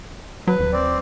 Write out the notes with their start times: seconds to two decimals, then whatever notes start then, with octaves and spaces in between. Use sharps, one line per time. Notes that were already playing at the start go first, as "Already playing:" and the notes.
0.47 F#3 B4
0.60 D#1
0.73 C4 D5